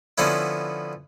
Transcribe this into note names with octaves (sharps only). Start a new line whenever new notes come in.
D3 F3 B3 C#4 E4